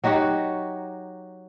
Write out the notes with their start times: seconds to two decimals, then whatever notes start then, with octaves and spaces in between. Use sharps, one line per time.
0.04 F#3 D#4 F#4 G4